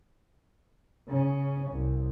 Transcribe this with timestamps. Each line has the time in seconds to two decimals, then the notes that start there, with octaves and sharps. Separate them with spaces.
1.08 C#3 C#4
1.71 C2